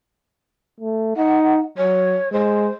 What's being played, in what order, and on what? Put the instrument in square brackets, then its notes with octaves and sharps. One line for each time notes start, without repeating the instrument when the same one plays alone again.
[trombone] A3
[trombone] D#4 [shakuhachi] F#5
[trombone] F#3 [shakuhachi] C#5
[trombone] G#3 [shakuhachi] C5